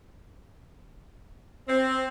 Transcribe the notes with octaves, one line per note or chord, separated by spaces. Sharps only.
C4